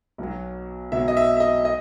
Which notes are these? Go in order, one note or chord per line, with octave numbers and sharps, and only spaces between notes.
B1 B2 F#3
B1 B2 F#3 E5
D#5
E5
E5
D#5
D#5